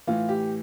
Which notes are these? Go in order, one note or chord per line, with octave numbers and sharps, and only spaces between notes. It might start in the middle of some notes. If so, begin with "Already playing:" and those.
A2 E3 F4
G4